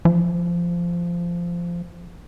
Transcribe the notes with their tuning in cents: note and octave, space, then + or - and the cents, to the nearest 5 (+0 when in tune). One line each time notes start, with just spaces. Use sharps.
F3 -15